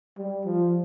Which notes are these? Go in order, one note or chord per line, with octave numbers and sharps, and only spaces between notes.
G3
F3